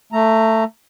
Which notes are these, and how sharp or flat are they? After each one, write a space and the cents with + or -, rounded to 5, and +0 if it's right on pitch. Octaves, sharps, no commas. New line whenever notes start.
A3 +15 A#5 -5